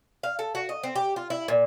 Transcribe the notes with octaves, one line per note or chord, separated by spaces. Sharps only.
F5
A4
F#4
D#5
C4
G4
F4
E4
A#2